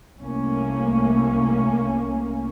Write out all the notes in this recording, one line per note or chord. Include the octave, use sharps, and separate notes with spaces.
C2 A3 A#3 C#4